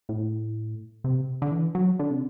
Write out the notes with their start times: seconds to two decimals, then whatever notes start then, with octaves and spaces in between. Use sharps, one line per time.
0.09 A2
1.04 C3
1.42 D3
1.51 E3
1.75 F#3
1.99 D3
2.11 C3